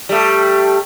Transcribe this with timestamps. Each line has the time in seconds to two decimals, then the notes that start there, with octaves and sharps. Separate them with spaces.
0.09 G3 A3